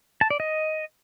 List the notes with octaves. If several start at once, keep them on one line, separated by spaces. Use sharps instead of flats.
A5
D5
D#5